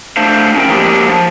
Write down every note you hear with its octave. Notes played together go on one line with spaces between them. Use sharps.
A3 D4 C5 F5
C#4 E4 G#4 A#4 G5
F3 F#3 G#3 A#3 D4 G4
F3